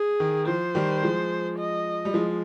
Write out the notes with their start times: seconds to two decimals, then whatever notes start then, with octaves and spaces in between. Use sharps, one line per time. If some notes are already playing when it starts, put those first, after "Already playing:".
Already playing: G#4
0.20 D#3
0.47 F3 C5
0.75 D#3 G3
1.03 F3 G#3
1.59 D#5
2.05 G3
2.14 F3 G#3